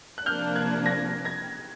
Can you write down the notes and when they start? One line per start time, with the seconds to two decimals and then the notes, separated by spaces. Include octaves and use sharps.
0.18 F#6
0.26 C3 F3 A#3 D4 F6 G6
0.56 F#6 G#6
0.86 G#6 A#6
1.25 G#6 A#6